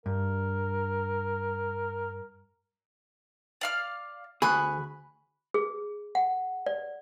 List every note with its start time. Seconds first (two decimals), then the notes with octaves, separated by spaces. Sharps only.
0.06 G2 A#4
3.61 D5 F5 F6
4.42 D2 G#4 B5 C#6 F#6
5.54 G#4
6.15 F#5
6.66 D5